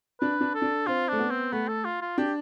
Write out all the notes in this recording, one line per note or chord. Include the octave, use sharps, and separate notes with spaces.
D4 B4
D4
A4
D4
C4 F4
A3 D4
B3
C4
A3 B3
A4
F4
F4
D4 G4